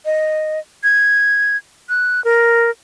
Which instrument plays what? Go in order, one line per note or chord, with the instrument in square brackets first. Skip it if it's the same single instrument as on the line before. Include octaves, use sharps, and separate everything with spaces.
[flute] D#5
G#6
F#6
A#4